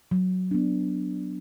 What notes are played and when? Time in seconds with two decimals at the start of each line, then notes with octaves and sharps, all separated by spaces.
0.11 F#3
0.51 B3 D4